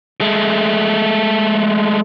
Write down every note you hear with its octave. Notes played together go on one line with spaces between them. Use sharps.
G#3 A3